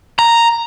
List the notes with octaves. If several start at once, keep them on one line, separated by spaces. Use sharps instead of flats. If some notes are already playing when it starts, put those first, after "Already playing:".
A#5